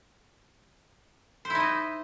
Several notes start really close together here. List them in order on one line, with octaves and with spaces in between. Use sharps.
C5 E4 D#4 D#5